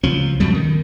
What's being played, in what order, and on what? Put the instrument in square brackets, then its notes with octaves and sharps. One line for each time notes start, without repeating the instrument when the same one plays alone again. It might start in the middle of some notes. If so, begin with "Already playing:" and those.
[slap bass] C#2 F3 C#4
F2 B2 G3
D#3